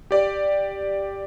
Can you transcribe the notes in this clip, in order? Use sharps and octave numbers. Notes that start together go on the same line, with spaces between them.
G4 D5